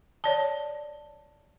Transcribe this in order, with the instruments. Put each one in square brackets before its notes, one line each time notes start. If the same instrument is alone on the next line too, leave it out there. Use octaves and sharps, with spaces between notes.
[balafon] C#5 D5 A5